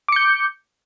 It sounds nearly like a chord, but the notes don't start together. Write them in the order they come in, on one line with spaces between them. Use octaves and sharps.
D6 C#7 G6